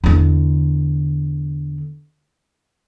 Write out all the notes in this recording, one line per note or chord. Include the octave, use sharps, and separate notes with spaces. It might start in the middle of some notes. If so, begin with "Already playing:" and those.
E2 D3